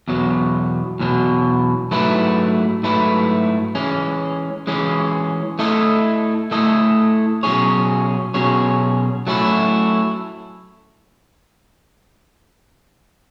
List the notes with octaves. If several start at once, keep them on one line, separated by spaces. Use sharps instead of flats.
E2 B2 F#3
E2 B2 F#3
G#2 F#3 A3 E4 B4
G#2 F#3 A3 E4 B4
E3 G#3 C#4
E3 G#3 C#4
A3 E4 A4 D#5
A3 E4 A4 D#5
B2 F#3 C#4 G#4 C#5
B2 F#3 C#4 G#4 C#5
F#3 A3 C#4 E4